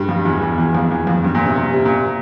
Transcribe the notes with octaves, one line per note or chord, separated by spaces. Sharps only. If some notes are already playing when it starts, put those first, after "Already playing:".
Already playing: G2
F2
E2
E2
E2
F2
E2
F2
G2
A#2
C3
C3
C3
A#2